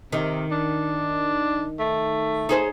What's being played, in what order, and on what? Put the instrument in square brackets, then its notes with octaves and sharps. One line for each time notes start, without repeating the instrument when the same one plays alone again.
[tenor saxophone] C3 [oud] D#3
[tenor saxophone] D4
A3
[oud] D#4 G#4 C5